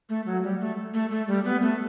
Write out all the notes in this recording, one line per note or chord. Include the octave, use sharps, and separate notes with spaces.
A3
F#3
G3
A3
A3
A3
G3
B3
A3